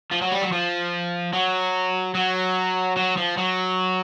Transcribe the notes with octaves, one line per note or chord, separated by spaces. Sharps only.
F3
F#3
G3
F#3
F3
F#3
F#3
F#3
F3
F#3